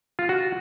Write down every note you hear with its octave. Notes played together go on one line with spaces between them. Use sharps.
F4
F#4